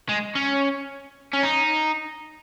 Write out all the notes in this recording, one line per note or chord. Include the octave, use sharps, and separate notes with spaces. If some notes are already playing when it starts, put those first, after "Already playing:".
G#3
C#4
C#4
D#4